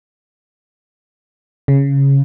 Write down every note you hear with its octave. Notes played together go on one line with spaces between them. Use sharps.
C#3